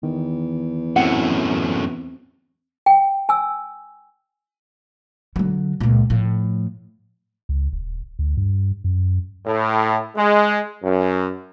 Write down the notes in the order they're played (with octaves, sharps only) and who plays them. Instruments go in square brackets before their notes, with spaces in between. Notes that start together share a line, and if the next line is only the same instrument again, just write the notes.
[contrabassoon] E2 [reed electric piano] D#3
[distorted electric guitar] F#2 A2 [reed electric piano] C4 [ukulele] F#5
[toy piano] G5
G#5 E6
[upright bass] D3 F#3
C#2 A#2
A2 F3
[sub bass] C#2
D#1
D2
G2
F#2
[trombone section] A2
G#3
F#2